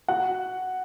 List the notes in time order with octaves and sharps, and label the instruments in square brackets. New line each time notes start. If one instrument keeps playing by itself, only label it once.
[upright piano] F#4 F#5